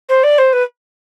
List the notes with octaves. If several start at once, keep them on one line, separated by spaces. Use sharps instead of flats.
C5
D5
C5
B4